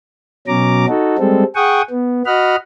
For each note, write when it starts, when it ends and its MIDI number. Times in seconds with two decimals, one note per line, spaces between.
0.47 0.86 47
0.47 0.86 54
0.47 0.86 61
0.47 0.86 82
0.47 0.86 86
0.88 1.16 63
0.88 1.16 66
0.88 1.16 69
1.18 1.44 55
1.18 1.44 56
1.18 1.44 60
1.18 1.44 69
1.55 1.82 68
1.55 1.82 78
1.55 1.82 79
1.55 1.82 85
1.55 1.82 87
1.91 2.23 59
2.26 2.56 66
2.26 2.56 75
2.26 2.56 78
2.26 2.56 83
2.26 2.56 89